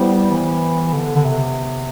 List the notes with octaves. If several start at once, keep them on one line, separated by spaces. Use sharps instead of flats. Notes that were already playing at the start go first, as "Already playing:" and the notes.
Already playing: G3 B3 E4 G4 C5
E3
D3
D3
C3